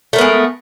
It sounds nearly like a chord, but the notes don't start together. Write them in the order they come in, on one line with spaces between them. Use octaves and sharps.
A3 A#4 B3 G#3